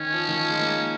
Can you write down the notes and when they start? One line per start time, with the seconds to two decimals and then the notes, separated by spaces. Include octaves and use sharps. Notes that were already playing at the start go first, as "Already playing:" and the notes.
Already playing: D#3 C#4
0.13 F3
0.29 D#3
0.37 F3
0.50 G#3
0.59 A#3